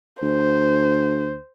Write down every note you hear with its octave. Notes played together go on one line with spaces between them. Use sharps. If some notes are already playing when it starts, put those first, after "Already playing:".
D2 C5